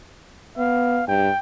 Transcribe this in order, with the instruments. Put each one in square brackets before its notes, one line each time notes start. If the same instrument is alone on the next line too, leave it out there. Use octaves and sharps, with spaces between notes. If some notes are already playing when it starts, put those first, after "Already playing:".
[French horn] B3 [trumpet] F5
[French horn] G2 [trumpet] G5